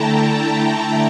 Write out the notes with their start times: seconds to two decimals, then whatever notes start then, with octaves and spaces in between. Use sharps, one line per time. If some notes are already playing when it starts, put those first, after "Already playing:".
Already playing: D3 A3 E4 G5 A5 A#5
0.16 A#5
0.63 A5